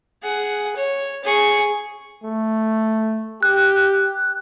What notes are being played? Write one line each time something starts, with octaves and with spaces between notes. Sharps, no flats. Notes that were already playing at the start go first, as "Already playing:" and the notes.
G#4 F#5
C#5
G#4 C#6
A3
G4 F#6